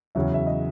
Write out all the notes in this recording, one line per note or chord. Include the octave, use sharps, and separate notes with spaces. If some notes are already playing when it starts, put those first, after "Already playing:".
E2 C#3 F#3 E5
E5
D#5